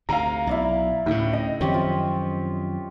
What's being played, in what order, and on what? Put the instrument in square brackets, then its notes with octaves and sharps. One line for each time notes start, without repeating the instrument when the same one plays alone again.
[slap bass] D2 C3 [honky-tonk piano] F5 A#5
[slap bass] B1 [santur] E4 D5 E5
[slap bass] D2 C#3 [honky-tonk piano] A2
[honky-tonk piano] D#5 [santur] G5
[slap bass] F#2 D#3 F3 [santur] C4 G4 C#5
[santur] F4